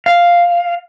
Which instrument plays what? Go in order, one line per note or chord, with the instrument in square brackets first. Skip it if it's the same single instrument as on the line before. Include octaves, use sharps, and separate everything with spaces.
[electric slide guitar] F5